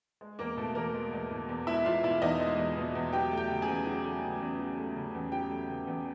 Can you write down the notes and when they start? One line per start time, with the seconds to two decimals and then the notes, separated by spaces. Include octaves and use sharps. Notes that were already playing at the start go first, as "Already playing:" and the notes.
0.21 G#3
0.39 E2 A#3 A#4
0.57 B2 A3 A4
0.75 E2 A#3 A#4
0.94 G#3
1.13 E2
1.31 B2
1.49 E2
1.67 G#3 E4 E5
1.85 E2 F4 F5
2.03 B2 E4 E5
2.22 E2 D#4 D#5
2.40 G#3
2.58 E2
2.77 B2
2.95 E2
3.13 F#3 G4 G5
3.31 A3
3.37 G4 G5
3.49 C#3
3.62 G#4 G#5
3.68 E2
3.87 F#3
4.04 A3
4.23 C#3
4.41 E2
4.59 F#3
4.77 A3
4.96 C#3
5.14 E2
5.32 F#3 G4 G5
5.50 A3
5.69 C#3
5.87 E2